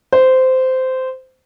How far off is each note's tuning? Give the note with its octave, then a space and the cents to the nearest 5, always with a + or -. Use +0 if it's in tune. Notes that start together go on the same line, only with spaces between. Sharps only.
C5 -15